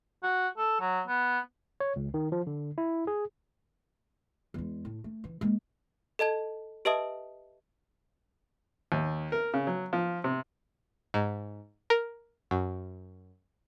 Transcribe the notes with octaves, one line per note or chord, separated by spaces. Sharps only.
F#4
A4
F#3
B3
C#5
C#2
D#3
F3
D3
E4
G#4
E2 G#3
A2
A3
E3
G#3 A#3
A4 D#5 A5 G#6
G4 B4 D#5 E5 A5 D#6
D#2
A#4
C#3
F#3
F3
C3
G#2
A#4
F#2